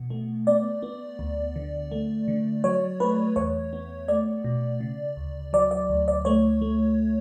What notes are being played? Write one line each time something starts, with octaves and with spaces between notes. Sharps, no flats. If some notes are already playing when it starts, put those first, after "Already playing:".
Already playing: B2 B3
A3
B3 D5
B3
D2
D3
A3
D3
F#3 C#5
A3 B4
E2 C#5
B3
A3 D5
B2
C#3
D2
F#3 D5
D5
D2
D5
A3 C#5
A3